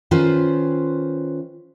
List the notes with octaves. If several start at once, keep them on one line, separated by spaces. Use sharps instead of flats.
D#3 C#4 F4 B4 C5